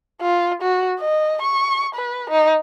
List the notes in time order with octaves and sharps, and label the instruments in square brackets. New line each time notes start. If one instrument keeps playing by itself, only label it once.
[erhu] F4
F#4
D#5
C#6
B4
D#4